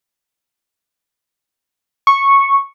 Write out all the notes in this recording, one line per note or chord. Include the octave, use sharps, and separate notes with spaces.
C#6